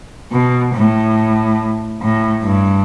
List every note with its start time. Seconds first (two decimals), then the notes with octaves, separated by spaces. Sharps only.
0.32 B2
0.74 A2
2.01 A2
2.44 G2